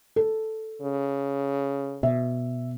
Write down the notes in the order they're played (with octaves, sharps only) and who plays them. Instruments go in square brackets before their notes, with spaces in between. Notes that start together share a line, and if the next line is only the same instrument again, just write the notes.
[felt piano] A4
[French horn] C#3
[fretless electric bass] B2 [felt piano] E5